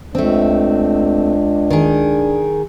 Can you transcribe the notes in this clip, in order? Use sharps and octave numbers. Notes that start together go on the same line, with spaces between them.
C#2 A3 C4 D4
D#3 G#4